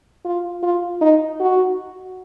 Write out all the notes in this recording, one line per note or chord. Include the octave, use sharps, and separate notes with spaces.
F4
F4
D#4
F#4